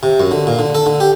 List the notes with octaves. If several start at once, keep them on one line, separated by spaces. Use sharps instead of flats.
C3
F#2
D3
A#2
D3
A4
D3
G4